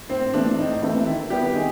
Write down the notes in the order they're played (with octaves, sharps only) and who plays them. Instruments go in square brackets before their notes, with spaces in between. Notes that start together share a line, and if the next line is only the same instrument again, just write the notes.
[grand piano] A2 [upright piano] C4
[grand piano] E3 A3 C4 E4 [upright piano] D4
[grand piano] A2 [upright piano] D#4
[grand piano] E3 A3 C4 E4
[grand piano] D#3 [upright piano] E4
[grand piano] G3 B3 E4 [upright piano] G4
[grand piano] D#3 [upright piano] G#4